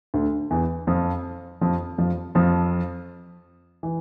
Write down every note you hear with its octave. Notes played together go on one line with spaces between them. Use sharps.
D2 D3
E2 E3
F2 F3
F2 F3
F2 F3
F2 F3
E3